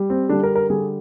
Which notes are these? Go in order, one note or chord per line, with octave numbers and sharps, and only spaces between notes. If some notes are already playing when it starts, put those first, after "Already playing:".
Already playing: G3
C4
D3 G3 D4
A#4
A#4
D3 G3 G#4